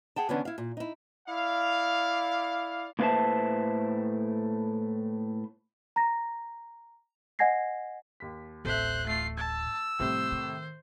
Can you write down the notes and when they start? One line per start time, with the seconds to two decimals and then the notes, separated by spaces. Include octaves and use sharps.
0.16 G#4 F#5 G5 A5
0.29 D3 E3 B3 C#4 D4
0.45 E4 F5
0.58 A#2
0.77 D#4 E4
1.28 E4 D5 F5
2.99 A2 A#3 B4 C5 E5 A5
5.96 A#5 A#6
7.39 D#5 F#5 G#5 G#6 A#6 C7
8.20 D#2 B6
8.65 D1 A1 A4 C5 E5 F#6
9.07 A3 F4 C7
9.37 A5 E6 G#6
10.00 A2 C3 F3 G3 C5
10.32 D#3